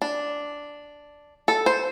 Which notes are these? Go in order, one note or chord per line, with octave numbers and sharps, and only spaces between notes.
D4
A4
C5